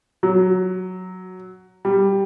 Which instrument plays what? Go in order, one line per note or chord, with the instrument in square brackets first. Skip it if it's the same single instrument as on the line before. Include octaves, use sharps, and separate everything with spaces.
[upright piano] F#3
G3